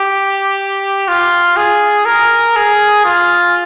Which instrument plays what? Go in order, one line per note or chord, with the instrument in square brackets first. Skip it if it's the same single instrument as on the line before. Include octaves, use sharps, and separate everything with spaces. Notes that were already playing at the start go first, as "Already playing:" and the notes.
Already playing: [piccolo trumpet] G4
F4
G#4
A#4
G#4
F4